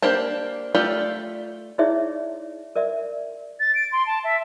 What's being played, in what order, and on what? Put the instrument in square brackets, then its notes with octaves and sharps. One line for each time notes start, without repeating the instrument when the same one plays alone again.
[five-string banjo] A#3 D4 G4 C5 A5
A3 F4 G4 D5
[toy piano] D#4 E4 G#4 C#5 D5 E5
A#4 D5 E5
[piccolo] A6
D7
C6
A5
E5